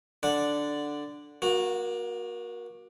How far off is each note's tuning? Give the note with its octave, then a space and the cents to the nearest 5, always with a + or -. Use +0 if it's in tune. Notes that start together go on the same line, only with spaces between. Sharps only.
D3 +0 D4 +0 F#5 -10
A#3 +25 F#4 -15